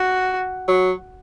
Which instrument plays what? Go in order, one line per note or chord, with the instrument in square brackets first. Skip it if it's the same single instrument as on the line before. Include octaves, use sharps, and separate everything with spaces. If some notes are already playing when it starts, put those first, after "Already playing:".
Already playing: [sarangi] F#4
[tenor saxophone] F#3